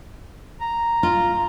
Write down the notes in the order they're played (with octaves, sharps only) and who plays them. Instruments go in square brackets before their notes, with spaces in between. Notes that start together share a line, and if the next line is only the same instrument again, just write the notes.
[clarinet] A#5
[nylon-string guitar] F4